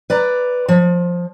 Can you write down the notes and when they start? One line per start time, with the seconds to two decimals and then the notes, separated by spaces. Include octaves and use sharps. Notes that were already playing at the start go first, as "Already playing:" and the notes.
0.10 B4 D5 A#5
0.68 F3